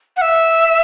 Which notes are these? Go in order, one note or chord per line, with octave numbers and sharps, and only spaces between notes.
F#5
E5